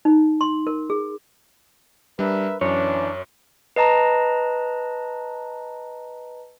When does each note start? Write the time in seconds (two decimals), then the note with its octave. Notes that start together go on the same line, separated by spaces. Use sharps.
0.05 D#4
0.41 C6
0.67 A#4
0.90 G#4
2.19 G3 D4 A#4 B4 E5
2.61 F#2 E3 C#4 D4 C#5
3.76 B4 D#5 A5 A#5